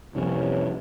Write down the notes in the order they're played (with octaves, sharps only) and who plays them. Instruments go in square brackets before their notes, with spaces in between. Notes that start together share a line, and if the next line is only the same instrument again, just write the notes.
[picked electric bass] F1 C2 F2 [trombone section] C3 E3 C#4